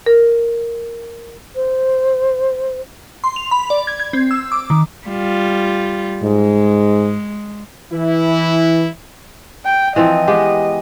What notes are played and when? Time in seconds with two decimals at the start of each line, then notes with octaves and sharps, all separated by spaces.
0.06 A#4
1.56 C5
3.24 C6
3.36 F7
3.51 B5
3.70 D5
3.87 G#6
4.00 G#6
4.13 C4
4.31 E6
4.52 D6
4.70 D#3
5.07 G3 F4
6.23 G#2 G#3
7.93 E3 E4
9.66 G5
9.96 E3 F3 C4 D#5
10.28 G#3 B3 G4